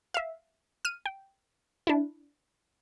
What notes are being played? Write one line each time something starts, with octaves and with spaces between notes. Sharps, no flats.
E5 F5
F6 D#7
G5
D4 E4